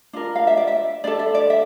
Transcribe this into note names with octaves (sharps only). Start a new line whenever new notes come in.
D4 F4 A#4
F5
E5
D5
E5
D4 A4 D5
E5
D5
E5